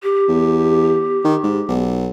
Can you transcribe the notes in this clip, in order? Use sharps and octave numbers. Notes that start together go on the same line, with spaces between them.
G4
E2
D#3
G#2
B1